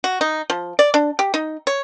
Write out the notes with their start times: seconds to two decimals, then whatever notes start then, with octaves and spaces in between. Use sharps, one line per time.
0.04 F#4
0.21 D#4
0.50 F3
0.79 D5
0.94 D4
1.19 G4
1.34 D#4
1.67 C#5